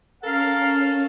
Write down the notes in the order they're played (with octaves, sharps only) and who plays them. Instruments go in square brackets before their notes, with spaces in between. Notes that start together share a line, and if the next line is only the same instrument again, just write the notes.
[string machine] C#4 [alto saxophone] A4 [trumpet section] A#4 F5